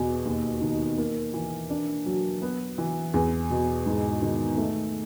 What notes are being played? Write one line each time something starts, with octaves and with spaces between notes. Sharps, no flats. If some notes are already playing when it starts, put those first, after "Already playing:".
Already playing: E2 B2
D#2
D#3
A#3
E3
D4
F#3
B3
E3
E2
B2
G#2
D#3
A3